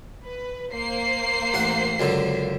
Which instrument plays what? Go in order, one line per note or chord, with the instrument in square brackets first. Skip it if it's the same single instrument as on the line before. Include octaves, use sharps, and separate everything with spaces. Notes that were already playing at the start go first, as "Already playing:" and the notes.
[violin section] B4
A#3 C5 C7
[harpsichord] A1 F#5
C#2 F#2 D3